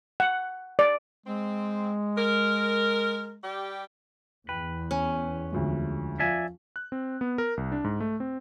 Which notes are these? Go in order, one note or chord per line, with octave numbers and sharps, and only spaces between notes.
F#5
D5
G#3 C4
A#4
G3 G4
E2 B4 G5
C#4
D2 F3 G#3
F3 D5 E5 F5 G#5
F#6
C4
B3
A#4
C2
D4
G#2
A3
C4